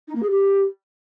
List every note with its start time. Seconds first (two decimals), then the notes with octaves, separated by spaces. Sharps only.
0.07 D#4
0.15 A#3
0.22 G#4
0.29 G4